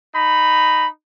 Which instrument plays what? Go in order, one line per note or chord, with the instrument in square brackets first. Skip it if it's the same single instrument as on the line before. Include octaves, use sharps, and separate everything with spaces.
[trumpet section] D#4 B5